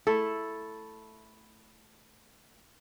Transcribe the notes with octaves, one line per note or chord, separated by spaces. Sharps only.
A3 E4 A4